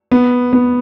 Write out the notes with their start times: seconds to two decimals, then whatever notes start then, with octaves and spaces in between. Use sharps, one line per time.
0.12 B3
0.53 B3